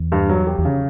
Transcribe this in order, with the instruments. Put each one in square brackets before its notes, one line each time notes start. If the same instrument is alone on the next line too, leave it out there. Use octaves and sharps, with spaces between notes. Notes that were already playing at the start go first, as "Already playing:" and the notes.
Already playing: [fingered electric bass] E2
[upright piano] G2
F#3
G4
[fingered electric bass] E2
[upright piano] C#3